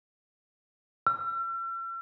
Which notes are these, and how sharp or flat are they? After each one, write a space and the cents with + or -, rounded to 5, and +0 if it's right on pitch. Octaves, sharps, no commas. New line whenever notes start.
E6 +45